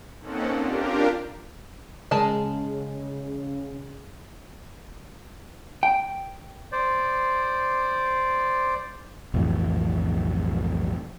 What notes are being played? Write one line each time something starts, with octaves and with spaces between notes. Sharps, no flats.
A#3 C4 C#4 D#4 A4 F#5
D4 F4 G4 A#4
C#3 G#3 A#4 A5
G5
C5 D5
B1 F2 A2 E3